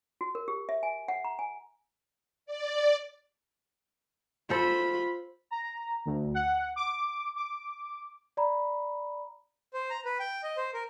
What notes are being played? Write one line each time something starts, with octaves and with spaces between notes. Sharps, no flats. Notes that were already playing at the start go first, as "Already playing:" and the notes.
F#4
A#4
G4
E5
G#5
F#5
A#5
G#5
D5
F4 A4 C5 B5
A#5
D2
F#5
D6
D6
D5 A#5 B5
C5
A#5
B4
G5
D#5
C5
A#4